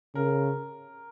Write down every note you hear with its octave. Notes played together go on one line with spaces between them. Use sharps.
C#3 A#4